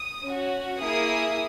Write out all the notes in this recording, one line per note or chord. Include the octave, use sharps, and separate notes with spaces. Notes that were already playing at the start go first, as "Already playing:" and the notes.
Already playing: D#6
C#4 F#4
A#3 E4 G#4 D#6